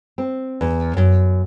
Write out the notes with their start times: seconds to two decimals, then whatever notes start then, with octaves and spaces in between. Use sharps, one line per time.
0.18 C4
0.61 E2
0.97 F#2